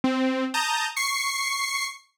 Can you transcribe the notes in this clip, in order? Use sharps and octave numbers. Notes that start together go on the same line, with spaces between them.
C4
A5 A#5 D#6 G6
C#6 C7 C#7